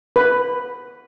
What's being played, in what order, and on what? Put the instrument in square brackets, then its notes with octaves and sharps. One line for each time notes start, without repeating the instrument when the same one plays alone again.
[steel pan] B4